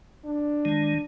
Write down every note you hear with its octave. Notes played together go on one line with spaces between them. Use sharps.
D4
D#3 G#3